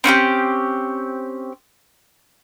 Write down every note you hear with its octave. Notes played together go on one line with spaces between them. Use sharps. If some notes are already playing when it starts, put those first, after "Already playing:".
C4 C#4 E4 G4